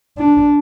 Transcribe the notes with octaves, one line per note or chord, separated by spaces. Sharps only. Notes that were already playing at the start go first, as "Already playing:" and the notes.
D4